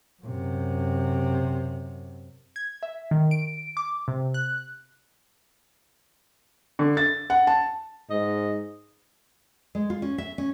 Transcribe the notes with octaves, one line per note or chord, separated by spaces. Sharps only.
F#2 C3
G#6
E5
D#3
D7
D6
C3
F#6
D3
A6
F#5
A5
G#2 D#5
G#3
F4
C#4
E5
C#4